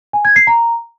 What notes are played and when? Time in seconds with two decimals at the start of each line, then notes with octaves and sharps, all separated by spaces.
0.13 G#5
0.25 G#6
0.36 C7
0.47 A#5